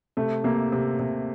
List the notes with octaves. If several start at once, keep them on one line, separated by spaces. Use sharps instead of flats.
C3 A3
C3 A#3
C3
C3